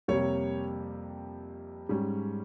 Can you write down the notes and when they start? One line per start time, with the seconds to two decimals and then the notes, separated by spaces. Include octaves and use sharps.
0.08 F2 C3 G3 A#3 C#5
1.89 G#2 G3 C#4